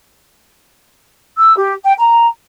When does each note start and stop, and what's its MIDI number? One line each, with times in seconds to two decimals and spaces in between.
1.37 1.56 88
1.58 1.74 67
1.85 1.94 79
1.99 2.27 82